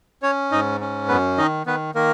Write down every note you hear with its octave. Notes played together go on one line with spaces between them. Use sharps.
C#4 C#5
G#2 D#4 D#5
C#4
F#2 B3 B4
D#3 D#4 D#5
D#3 B3 B4
D#3 A#3 A#4